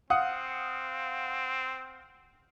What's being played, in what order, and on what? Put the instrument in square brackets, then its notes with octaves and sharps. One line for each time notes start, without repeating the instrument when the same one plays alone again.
[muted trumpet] C4 [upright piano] F5 F#5 D#6